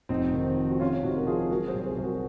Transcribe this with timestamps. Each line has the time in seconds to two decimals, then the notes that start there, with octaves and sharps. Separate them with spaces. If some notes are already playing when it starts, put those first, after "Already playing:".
0.09 F1 C4 D#4
0.33 D#3
0.57 F2
0.69 F#4
0.80 C3 C#4 F4
1.03 C3 D#4 F#4
1.16 A#4
1.27 F3 F4 G#4
1.50 F#3 F#4 A#4
1.68 G#4 C5
1.74 C2
1.85 G#4 C5
1.98 C2
2.03 F#4 A#4